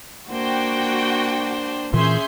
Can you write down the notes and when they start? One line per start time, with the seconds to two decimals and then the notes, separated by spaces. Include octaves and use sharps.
0.29 A#3 D4 F#4 C5 G5
1.94 A#2 E3 C#4 G#4 E5 C6 G6